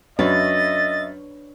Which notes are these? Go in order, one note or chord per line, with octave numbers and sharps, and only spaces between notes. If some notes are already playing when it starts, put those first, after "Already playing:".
F#2 D4 B4 C#5 D#5 E5 A6